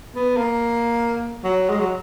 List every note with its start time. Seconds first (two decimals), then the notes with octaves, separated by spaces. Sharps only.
0.15 B3
0.37 A#3
1.44 F#3
1.69 G#3
1.79 F#3